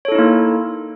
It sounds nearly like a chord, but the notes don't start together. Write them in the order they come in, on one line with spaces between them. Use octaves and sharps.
C#5 A4 E4 D#4 A#3